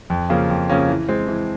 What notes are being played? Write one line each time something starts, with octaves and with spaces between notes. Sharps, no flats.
F2
C#3 F3 A#3 C#4
F2
C#3 F3 A#3 C#4
E3
G#3 C4
E3